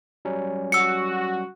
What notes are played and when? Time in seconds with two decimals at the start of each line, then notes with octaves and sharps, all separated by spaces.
0.25 F#3 G3 C#4
0.72 F#4 E6 C#7